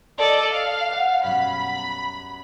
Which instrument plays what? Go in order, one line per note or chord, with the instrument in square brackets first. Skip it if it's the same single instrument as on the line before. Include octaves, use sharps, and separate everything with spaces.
[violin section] A4 D5 D#5
F5
[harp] B4 F#5
[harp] F#2 B2 G3 [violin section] B5
[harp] A#5